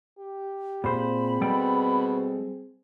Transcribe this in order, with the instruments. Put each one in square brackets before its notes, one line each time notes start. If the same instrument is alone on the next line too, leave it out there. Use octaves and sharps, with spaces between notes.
[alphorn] G4
[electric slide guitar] A#2 C5 [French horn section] C4 G#4 [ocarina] B5
[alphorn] B2 [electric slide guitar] G3 A4 G5